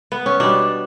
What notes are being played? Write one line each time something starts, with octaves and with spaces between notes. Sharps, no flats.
B3
C#4
B2 G3 D4